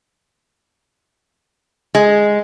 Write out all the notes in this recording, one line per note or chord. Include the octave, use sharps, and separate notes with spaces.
G#3